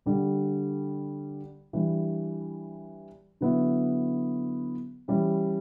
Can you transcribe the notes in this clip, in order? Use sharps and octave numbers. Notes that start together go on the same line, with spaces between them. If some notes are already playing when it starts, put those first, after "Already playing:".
D3 G3 D4
E3 G3 D4
D3 F#3 B3 E4
E3 G3 C#4 E4